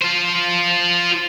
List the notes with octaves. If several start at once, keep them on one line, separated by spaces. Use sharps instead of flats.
F4 C5